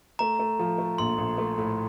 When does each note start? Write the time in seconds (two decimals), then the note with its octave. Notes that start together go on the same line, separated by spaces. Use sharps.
0.19 A3 A#5
0.39 A3
0.59 F3
0.78 A3
0.98 A#1 C6
1.18 A#1
1.38 A3
1.58 A2